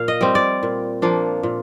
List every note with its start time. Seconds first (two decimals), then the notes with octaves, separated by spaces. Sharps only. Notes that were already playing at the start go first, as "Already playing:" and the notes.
Already playing: A#2 F5
0.08 D#5
0.21 G3 C4
0.35 D5
0.63 A#2
1.02 F3 A#3 D4
1.43 A#2